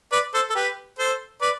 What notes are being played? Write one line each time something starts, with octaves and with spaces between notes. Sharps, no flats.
B4 D5
A4 C5
A4
G4 B4
A4 C5
B4 D5